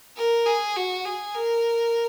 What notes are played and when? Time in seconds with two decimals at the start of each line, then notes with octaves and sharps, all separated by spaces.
0.17 A#4
0.46 G#4
0.76 F#4
1.05 G#4
1.35 A#4